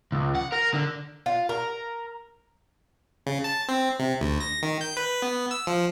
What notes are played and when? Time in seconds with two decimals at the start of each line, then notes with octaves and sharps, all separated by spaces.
0.12 C#2
0.35 F#5
0.52 A#4
0.74 D3
1.26 F4
1.49 A#4
3.27 C#3
3.44 A5
3.68 C4
3.99 C3
4.21 D2
4.40 A#6
4.62 D#3
4.81 G6
4.97 B4
5.22 B3
5.51 E6
5.67 F3